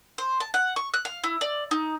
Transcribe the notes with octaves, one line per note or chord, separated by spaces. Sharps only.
C5
A5
F#5
C#6
F#6
F5
E4
D5
D#4